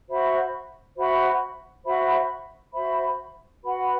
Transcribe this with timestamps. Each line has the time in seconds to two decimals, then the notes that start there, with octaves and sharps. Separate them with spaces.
0.08 F#4 C5 E5 B5
0.96 F#4 C5 E5 B5
1.84 F#4 C5 E5 B5
2.73 F#4 C5 E5 B5
3.62 F#4 B4 F#5 B5